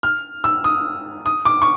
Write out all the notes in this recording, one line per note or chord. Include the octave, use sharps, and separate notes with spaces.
F6
E6
D#6
D#6
D6
C#6